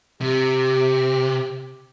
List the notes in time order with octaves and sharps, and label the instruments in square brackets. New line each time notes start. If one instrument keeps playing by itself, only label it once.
[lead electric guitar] C3 [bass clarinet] G4